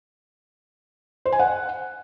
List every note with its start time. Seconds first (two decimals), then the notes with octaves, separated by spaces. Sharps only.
1.26 C5
1.32 G#5
1.39 F#5